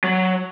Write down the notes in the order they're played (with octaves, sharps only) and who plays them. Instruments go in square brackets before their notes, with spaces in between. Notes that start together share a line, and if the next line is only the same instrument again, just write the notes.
[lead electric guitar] F#3